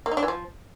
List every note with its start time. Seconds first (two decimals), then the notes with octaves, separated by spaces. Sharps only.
0.06 A#3
0.11 D#4
0.17 D4
0.23 E3
0.28 F3